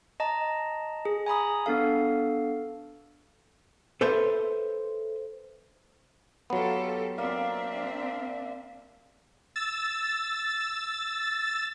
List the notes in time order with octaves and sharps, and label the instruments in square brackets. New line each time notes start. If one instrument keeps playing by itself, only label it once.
[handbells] D#5 A5 A#5
G#4
G#5 A#5 B5 D#6
B3 D4 A4 F5
[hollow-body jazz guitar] A4 B4 C5 E5
[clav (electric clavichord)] F#3 B3 [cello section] F4 G4 A4
[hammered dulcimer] A#3 D5 F5 [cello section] C4 D4 E5
[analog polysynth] E6 A6